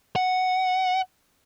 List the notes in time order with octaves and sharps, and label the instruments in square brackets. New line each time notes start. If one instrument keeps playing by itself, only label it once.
[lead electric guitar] F#5